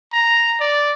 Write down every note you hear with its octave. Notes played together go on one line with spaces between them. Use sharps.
A#5
D5